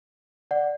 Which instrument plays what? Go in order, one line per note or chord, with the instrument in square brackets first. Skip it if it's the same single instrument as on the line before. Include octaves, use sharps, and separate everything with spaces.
[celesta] D5 F#5